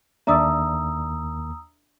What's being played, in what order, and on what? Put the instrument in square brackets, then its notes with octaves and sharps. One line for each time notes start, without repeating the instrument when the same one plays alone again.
[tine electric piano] D#2 A#3 [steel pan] D4 D5 E5 [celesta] A#5 D#6 E6